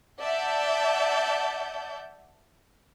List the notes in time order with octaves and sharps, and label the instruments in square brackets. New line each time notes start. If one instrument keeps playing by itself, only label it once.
[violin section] D5 E5 F#5 A5 G6